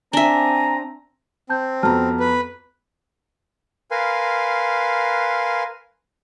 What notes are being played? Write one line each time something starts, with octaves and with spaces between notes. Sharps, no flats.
C4 D4 E5 G#5 A#5
C4 A5 G6
F2 B3 F#4 A5 A#5 F6
B4
A#4 B4 F5 G#5 C6